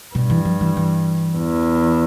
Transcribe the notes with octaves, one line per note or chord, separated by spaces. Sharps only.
G2 B2
E3
F3
E3
E3
E2